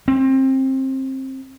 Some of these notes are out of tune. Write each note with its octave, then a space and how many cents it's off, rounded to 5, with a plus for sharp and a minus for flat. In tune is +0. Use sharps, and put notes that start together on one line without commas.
C4 +25